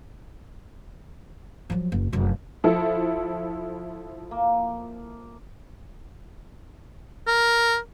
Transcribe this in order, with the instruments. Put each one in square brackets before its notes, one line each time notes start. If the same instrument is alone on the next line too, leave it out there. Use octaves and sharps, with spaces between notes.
[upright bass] F3 F#3
F#1
F1 F#2
[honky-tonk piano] F3 E4 A4
[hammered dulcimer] A#3
[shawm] A#4